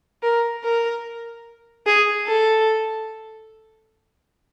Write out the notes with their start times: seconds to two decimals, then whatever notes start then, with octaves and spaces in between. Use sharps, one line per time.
0.23 A#4
0.64 A#4
1.86 G#4
2.27 A4